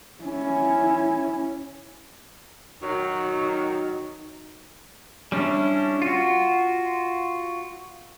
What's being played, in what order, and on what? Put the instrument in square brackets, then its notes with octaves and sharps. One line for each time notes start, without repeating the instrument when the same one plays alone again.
[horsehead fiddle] C#4 E4
[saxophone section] D#3 F#3 [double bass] D#4 [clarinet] F#4
[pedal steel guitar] G3 C#4 D4 E4
F4 F#4